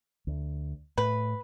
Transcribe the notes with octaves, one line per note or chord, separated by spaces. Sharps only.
D2
A2 B4